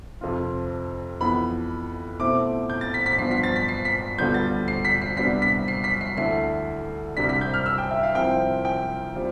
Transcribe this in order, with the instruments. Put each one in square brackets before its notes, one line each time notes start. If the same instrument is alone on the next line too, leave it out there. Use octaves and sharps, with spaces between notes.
[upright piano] F2 C3 F3 C4 F4
F2 E3 B3 B5
B2 A3 C4 E4 D6
G6
A6
B6
B6
G2 F3 B3 C7
B6
A6
B6
C7
B6
D2 D3 G3 B3 F4 G6
A6
C7
B6
C7
C2 C3 G3 B3 D4 B6
B6
C7
B6
C7
D2 D3 A3 E4 C7
C2 C3 G3 D4 B6
B6
G6
F6
E6
G5
E5
F5
C2 C3 F3 C4 E4 G5
G5
G3 C4 F4